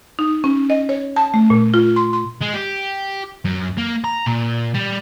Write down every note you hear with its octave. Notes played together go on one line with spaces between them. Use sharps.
D#4
C#4
D#5
C#5
A5
A3
A#2
F4
C6
C6
G#3
G4
F#2
A#3
A#5
A#2
G3